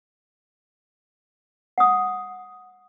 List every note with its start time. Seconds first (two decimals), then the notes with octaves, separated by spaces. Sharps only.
1.78 F#5 D#6